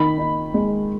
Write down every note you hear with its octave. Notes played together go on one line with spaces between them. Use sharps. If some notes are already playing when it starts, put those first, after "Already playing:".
Already playing: D#3 B5
D#4
G#3